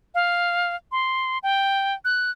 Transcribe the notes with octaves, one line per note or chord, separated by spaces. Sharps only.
F5
C6
G5
F#6